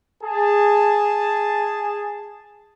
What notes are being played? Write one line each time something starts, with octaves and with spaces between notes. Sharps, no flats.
G#4 A5